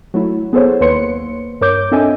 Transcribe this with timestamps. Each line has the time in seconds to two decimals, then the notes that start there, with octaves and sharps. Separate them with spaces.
0.14 F#3 A3 E4
0.53 B3 G#4 A4 C5 C#5
0.81 D#2 A#3 B4 C#5 C6 C#7
1.61 G2 A#4 C#5 D6 G6
1.92 C4 D4 A4 D#5 E5 G#5